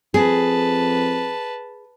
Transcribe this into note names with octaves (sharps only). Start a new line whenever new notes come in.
F2 G#4 B4 A5